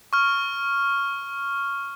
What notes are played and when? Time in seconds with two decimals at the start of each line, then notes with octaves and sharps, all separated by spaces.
0.13 C#6 F6